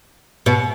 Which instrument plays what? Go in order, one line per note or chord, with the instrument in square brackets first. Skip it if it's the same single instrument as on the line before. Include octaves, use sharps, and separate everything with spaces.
[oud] B2